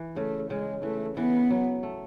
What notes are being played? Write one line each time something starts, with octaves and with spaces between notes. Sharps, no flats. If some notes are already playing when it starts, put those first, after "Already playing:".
Already playing: E3
C#3 A3
C#3 G#3
E3 A3
E3 B3
F#3
A3